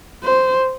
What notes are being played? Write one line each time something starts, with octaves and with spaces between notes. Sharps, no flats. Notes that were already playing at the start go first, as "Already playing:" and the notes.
C5